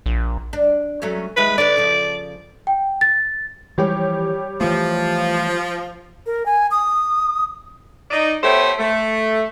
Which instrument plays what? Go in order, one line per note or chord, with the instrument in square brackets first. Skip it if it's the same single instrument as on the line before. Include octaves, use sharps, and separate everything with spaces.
[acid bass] A#1
[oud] D4
F#3 A3 C#4
[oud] D#2 G#3 E5 [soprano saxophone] B4
[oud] D3 B4 [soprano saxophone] D5
[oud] C#3 F3
[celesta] G5
A6
[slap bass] E3 F3 [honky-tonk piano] G3 G4 C#5
[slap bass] E3 A3 [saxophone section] F3
[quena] A#4
G#5
D#6
[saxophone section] D#4 D5 D#5
A3 B3 G4 C5 C#5 E5
A3